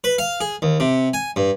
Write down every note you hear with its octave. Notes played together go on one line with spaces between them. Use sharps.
B4
F5
G#4
D#2
C3
G#5
G2